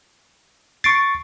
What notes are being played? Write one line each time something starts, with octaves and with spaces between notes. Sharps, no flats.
C#6 A6 C7 D7